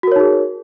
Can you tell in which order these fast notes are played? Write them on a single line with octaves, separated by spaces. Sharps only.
F#4 A#4 C#5 D#4 G#4